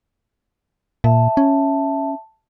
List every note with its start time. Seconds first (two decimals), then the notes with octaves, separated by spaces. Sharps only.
1.04 A#2 E5 A5
1.37 C#4